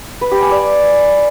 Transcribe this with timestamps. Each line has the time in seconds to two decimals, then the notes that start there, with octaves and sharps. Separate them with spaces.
0.21 B4
0.31 G4
0.41 G#5
0.51 D5